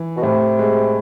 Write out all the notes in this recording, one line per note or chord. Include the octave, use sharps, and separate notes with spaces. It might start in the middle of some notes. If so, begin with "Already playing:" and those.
Already playing: E3
B2
A2 C3
G#3